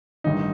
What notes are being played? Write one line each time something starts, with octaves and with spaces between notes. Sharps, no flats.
A1 G2 D#3 D#4